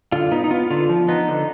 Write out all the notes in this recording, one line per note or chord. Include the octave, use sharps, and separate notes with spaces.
D3 F4
B3 D#4
D#4
B3 F4
D3 F4
F3
B3 D#4
D3